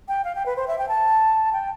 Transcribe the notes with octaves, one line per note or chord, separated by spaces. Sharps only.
G5
F5
G5
B4
C5
E5
G5
A5
G5